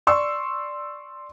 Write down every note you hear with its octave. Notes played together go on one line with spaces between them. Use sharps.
D5 C6 C#6 E6